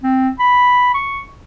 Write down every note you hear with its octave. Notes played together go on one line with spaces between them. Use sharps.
C4
B5
C#6